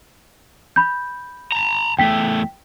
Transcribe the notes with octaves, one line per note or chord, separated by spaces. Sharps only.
B5 G6
A5 A#5
E2 A3 G5 B6